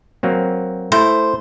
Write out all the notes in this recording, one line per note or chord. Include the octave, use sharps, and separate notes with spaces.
F#3 A#3 C4
A3 E4 C5